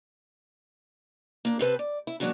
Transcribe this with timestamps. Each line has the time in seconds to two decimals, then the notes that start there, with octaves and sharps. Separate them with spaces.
1.45 A#3 D4
1.59 C3 C4 B4 A5
1.79 D5
2.07 E4
2.20 D#2 A#2 F#3 G#3 D4 F#4